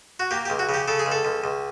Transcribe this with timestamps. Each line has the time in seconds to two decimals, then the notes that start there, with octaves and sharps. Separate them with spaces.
0.20 F#4
0.31 A#3 G4
0.46 G4
0.50 C#2
0.59 F#4
0.69 C#3
0.74 G4
0.88 C#3 A4
0.99 G#4
1.06 C#2
1.12 A4
1.25 C#2
1.44 C#2